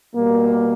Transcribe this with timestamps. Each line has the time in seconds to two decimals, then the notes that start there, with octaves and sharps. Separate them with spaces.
0.16 B2 G3 A#3